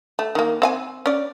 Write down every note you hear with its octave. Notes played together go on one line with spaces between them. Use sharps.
A3
D#3 A#3
C4 F5 G#5
C#4 D5